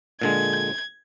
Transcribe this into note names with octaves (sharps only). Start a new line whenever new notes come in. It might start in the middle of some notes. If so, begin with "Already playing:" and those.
A#2 D3 G#3 G#6